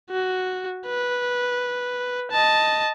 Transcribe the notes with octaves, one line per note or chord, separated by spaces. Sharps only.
F#4
B4
D#5 A5